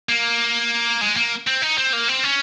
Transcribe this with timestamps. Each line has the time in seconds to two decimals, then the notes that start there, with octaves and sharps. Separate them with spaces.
0.09 A#3
1.01 G#3
1.16 A#3
1.47 C4
1.62 D#4
1.78 C4
1.93 A#3
2.08 C4
2.24 C#4